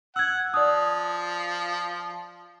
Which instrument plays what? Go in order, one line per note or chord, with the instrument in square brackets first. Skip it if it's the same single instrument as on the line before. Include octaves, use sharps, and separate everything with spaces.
[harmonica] F#5 [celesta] E6 G#6
[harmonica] F3 [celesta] D5 D#6